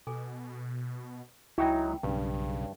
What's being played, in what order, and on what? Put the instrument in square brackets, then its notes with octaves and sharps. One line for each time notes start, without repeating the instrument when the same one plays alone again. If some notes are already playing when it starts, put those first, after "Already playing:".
[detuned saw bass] B2 [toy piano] A4 G#5 D6
[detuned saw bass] C#2 [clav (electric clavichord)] F#3 D#4 F#4 [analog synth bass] E4 [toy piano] G5 G#5 B5
[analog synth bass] B1 [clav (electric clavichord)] G2 [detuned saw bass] C#3